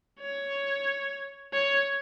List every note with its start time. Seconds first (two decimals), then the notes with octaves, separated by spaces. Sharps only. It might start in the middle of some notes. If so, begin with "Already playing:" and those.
0.20 C#5
1.53 C#5